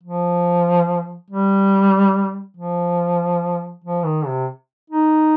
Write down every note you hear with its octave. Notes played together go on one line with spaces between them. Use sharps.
F3
G3
F3
F3
D#3
C3
D#4